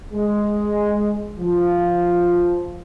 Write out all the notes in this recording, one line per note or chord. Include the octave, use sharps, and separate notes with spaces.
G#3
F3